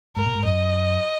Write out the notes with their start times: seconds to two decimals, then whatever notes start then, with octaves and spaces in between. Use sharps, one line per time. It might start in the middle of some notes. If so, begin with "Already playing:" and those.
0.16 G#2 A#4
0.26 A#2
0.35 G#2
0.44 F#2 D#5